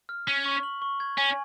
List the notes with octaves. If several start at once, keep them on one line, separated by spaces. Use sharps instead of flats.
F6
C#4 B6
C#6
F#7
C#6
G#6
C#4 G#5